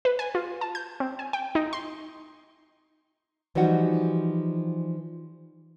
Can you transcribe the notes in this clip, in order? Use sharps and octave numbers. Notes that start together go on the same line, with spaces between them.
B4
G#5
F4
A5
G6
C4
G#5
G5
D#4
C6
E3 F3 G3 D#4 F#4 F#5